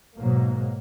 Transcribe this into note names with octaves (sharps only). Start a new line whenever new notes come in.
G#2 B2 F#3 A#3